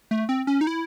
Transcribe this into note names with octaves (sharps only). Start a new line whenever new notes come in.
A3
C4
C#4
D#4
E4